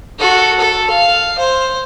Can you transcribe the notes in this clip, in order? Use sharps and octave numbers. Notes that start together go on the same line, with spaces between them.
F#4 A4
A4
F5
C5